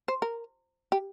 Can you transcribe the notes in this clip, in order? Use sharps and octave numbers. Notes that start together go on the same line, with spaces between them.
C5
A#4
G4